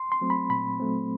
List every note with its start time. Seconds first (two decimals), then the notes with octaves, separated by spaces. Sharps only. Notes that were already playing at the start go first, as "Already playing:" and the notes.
Already playing: C6
0.12 C6
0.21 F#3 A3 C4
0.30 B5
0.50 A#2 B5
0.80 F#3 A3 C4